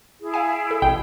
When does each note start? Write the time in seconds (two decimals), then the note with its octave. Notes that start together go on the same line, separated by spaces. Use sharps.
0.20 E4 G#4
0.34 F5 G#5
0.71 A4
0.82 A1 B2 G5